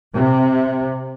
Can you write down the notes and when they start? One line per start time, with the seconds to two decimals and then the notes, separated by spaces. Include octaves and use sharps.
0.14 C3